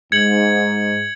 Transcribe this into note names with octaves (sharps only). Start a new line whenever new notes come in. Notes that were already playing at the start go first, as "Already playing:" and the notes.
G#2 G#6 C#7 F#7